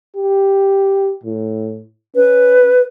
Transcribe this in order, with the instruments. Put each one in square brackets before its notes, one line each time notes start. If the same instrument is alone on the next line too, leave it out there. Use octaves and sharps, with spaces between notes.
[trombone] G4
A2
[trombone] C#4 [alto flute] B4